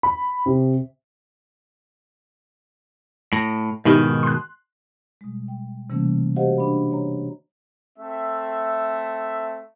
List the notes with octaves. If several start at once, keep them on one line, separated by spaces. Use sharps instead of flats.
B5
C3
A2 A#6
G#2 B2 D#3 D#4 E4 G4
C6 F#6
B2 G3 G#3
G5
C3 E3 G3 A3 A#3 C#4
F#4 G4 C5 D#5 F5 F#5
D4 D5 B5
C#5 A#5
A3 C4 E5